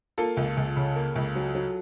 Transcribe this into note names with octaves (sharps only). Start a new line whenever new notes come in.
A#3 F4 A4
C#2
C#2
C#3
A#3
C#2
F#3
F#3